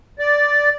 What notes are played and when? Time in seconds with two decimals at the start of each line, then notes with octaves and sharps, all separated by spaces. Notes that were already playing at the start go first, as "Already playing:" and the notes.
0.19 D5